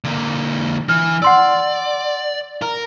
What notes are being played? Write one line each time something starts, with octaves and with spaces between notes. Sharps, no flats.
D3 A#3
E3 F6
D5 F#5 C6 E6
A#4